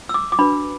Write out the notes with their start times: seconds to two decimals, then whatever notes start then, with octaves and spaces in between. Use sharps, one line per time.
0.09 E6
0.14 D6
0.32 D6
0.39 D4 F#4 B4 B5